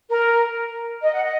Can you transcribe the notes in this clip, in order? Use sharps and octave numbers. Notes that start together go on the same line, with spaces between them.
A#4
D#5
F#5
D#5